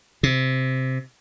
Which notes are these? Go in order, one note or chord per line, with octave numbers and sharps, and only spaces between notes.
C3